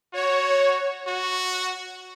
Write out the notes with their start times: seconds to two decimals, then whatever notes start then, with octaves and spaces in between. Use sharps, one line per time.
0.13 F#4 C#5
1.07 F#4